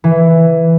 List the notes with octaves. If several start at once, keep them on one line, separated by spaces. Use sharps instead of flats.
E3